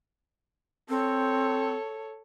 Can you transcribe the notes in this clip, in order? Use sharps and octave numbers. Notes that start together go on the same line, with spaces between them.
C4 A4 C#5